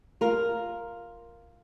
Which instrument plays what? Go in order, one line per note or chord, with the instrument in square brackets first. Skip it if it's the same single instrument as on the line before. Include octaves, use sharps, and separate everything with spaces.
[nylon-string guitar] F4 A#4